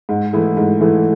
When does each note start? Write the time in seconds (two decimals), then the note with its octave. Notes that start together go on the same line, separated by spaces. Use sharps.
0.09 G#2
0.33 E3 A3 E4 G#4
0.57 G#2
0.80 E3 A3 E4 G#4